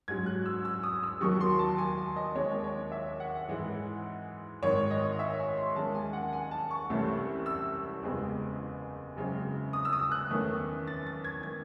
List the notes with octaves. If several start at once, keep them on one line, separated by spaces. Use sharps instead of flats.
G#2 F#3 C#4 G#6
F#6
E6
E6
D#6
E6
D#2 D#3 F#3 C#6
C6
A5
G#5
D#5
D#2 D#3 G#3 C4 C#5
C#5
E5
F#5
G#2 E3 G#3
G#1 G#2 D#3 C#5
D#5
E5
G#5
C6
D#2 D#3 G#3 C#4 A5
G#5
F#5
G#5
A5
C#6
C2 C3 E3 A3 C#4
E6
F#1 E2 C#3 G#3 C4
F#2 C#3 G#3 C4
D#6
E6
D#6
F#6
E2 D#3 A3 C#4
A6
A6
G#6
D#3 G#6